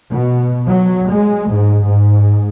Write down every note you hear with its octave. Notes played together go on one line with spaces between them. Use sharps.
B2
F#3
G#3
G#2
G#2